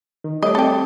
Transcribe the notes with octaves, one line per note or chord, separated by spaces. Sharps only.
D#3
G3 A3 C#5 D#5 D6
C4 A4 G5